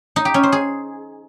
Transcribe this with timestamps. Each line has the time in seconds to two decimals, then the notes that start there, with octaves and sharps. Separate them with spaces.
0.16 D#4
0.25 G4
0.34 C#4
0.43 C5
0.52 G#4